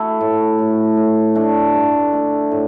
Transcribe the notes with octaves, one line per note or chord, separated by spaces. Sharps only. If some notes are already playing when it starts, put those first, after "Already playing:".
Already playing: A3 E4 F#4 A4
A2
A2
A2
A3 D4
G2
A3
A2